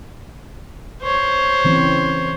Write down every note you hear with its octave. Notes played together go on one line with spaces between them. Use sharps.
C5 C#5
C#3 E3 C4